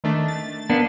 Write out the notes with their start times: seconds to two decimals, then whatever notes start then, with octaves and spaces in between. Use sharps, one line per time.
0.04 D#3 A3 D4
0.28 A6
0.70 A#3 B3 D4